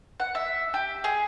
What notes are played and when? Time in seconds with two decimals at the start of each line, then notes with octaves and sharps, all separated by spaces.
0.20 F#5
0.35 E5
0.74 G4
1.04 G#4